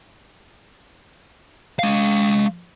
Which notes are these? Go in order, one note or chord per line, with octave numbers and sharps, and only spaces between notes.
G#3 F5